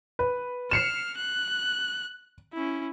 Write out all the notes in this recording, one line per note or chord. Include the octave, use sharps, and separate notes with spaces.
B4
F6 C7 C#7 E7
F#6
C#4 E4